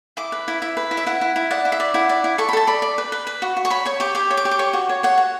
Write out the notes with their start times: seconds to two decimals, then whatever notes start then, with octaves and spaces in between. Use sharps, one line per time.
0.17 E4 D6
0.32 B4
0.48 E4
0.62 E4 E5
0.77 B4
0.91 E4
0.97 E5
1.06 E4 F#5
1.21 E4
1.36 E4
1.51 D5 F#5
1.65 E4
1.72 E5
1.80 D5
1.94 E4 F#5
2.09 D5
2.24 E4
2.38 A4 C#6
2.49 B5
2.53 A4 A5
2.67 D5 B5
2.82 D5
2.98 B4
3.12 B4
3.27 B4
3.42 F#4
3.57 F#4
3.65 C#6
3.70 C#5 B5
3.86 C#5 C#6
4.00 G4 D6
4.15 G4 D6
4.30 C#5
4.37 D6
4.45 G4
4.51 D6
4.59 C#5 C#6
4.73 F#4
4.89 C#5
5.03 C#5 F#5
5.18 F#4